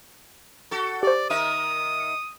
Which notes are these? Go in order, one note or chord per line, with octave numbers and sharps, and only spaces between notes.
F#4 A4
G4 C5 D5
D#3 A#4 E5 D#6
C#7